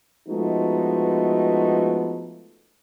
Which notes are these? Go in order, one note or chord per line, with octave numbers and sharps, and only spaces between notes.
F3 G#3 A3 B3 D#4 F#4